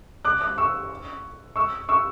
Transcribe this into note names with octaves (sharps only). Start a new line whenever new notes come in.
D6 F#6
D6 F#6
C#6 E6
C#6 E6
C#6 E6